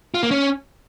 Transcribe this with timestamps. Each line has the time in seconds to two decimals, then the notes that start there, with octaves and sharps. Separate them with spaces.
0.14 F4
0.23 A#3
0.31 C#4